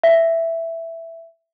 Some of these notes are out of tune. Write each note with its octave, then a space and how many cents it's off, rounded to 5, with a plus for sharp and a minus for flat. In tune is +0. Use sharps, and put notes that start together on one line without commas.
E5 +5